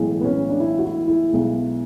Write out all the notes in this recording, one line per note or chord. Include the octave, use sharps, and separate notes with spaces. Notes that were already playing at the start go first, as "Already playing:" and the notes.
Already playing: B1 A2 E3 G#3
B3
C#4
D4
E4
F#4
E4
E4
B1 B2 G#3